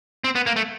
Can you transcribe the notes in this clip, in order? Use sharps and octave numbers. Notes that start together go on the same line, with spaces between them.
C4
B3
A#3
A3